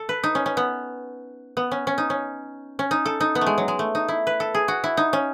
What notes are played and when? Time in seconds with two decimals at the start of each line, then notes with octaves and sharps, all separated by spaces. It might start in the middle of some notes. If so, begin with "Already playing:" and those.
Already playing: A4
0.09 B4
0.23 D#4
0.35 C#4
0.46 C#4
0.57 B3
1.57 B3
1.71 C#4
1.87 C#4
1.98 D#4
2.10 C#4
2.79 C#4
2.91 D#4
3.05 A4
3.20 D#4
3.35 B3
3.41 A3
3.47 G#3
3.58 F#3
3.68 G#3
3.79 A3
3.95 D#4
4.08 E4
4.27 B4
4.40 A4
4.54 G#4
4.68 F#4
4.84 E4
4.97 D#4
5.13 C#4